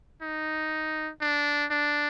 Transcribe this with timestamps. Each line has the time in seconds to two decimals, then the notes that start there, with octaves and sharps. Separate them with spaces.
0.22 D#4
1.21 D4
1.71 D4